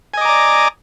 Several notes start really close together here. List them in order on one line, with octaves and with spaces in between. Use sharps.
G#5 D#5 D6 A#5 D5